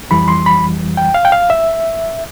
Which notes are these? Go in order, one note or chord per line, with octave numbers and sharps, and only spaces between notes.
F2 E3 G3 B5
C6
B5
G5
F5
G5
F5
E5